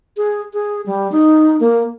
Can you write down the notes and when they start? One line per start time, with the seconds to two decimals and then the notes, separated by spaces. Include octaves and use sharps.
0.17 G#4
0.53 G#4
0.86 G3
1.12 D#4
1.60 A#3